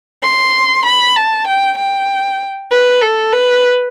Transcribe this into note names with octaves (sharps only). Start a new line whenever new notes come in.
C6
B5
A5
G5
G5
B4
A4
B4